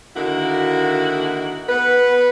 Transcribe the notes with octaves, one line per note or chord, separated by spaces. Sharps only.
D3 D#3 A#3 E4 F#4
B3 B4